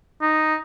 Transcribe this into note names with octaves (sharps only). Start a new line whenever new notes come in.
D#4